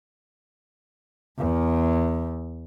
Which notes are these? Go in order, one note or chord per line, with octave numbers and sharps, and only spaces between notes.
E2